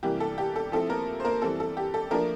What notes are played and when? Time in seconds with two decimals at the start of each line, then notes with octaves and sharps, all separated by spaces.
0.03 C3 E3 G3 A#3 G4
0.20 A4
0.38 G4
0.56 A4
0.72 F3 A3 C4 E4 A4
0.90 A#3 A#4
1.20 C5
1.25 A#3 A#4
1.42 E3 G3 C4 A4
1.60 A4
1.77 G4
1.94 A4
2.11 F3 A3 A#3 D4 A#4